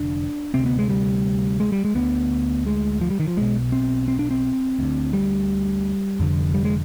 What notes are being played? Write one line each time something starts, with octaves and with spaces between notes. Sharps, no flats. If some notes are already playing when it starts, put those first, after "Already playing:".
Already playing: F1 D3 D4
D2 C3 C4
B3
G#3
G3
G#3
G3
G#3
D2 D3 B3
G#3
F3
G3
D#3
F3
B1 B2 G#3
C4
C4
D4
C4
D2 D3
G3
F1 F2 D3
G3
G#3